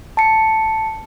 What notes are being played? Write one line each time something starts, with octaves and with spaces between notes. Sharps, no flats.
A5 C#7